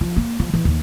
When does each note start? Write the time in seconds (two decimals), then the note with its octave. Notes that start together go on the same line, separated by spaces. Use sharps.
0.01 F3
0.16 A#3
0.39 F3
0.54 E3
0.65 D#2